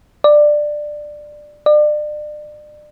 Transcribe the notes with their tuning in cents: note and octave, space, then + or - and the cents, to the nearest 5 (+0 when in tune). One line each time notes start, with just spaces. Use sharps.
D5 +15
D5 +35